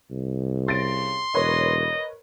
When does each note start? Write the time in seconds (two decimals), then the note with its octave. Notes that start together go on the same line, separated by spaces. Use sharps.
0.11 C2
0.68 C#3 C6 A6 A#6 D7
1.34 E1 A#4 B4 C#5 D#5